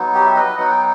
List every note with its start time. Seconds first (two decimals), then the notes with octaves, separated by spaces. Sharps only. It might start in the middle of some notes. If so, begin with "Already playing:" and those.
Already playing: F#3 B3 D#4
0.14 G4
0.25 E5
0.36 B4 D#5
0.58 F#3 B3 D#4 F#5
0.71 G5